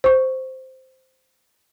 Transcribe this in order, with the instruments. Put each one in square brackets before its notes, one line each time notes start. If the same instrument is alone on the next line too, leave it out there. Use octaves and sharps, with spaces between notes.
[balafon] C5 C#6